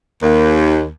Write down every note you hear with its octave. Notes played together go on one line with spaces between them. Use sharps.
D#2